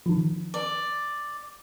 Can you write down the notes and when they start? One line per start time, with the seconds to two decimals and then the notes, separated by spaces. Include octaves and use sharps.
0.06 D#3 F3
0.54 D5